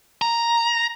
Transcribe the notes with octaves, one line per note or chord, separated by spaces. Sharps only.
A#5